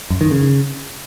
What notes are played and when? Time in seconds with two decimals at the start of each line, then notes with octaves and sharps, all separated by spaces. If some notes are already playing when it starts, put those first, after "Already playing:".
0.10 F#2
0.21 D#3
0.31 C#3